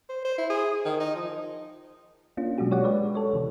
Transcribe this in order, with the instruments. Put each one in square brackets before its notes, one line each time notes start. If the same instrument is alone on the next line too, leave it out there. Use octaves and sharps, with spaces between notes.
[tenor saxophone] C5
C5
E4
G#4
D#3
D#4
F3
[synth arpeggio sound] A#3 C#4 D4 F4
B2 F#3 G#3 D4 F#4 G4
G4 C#5 D5 F#5
G#3 B4 D5
A4 C#5
C3 D#3 E3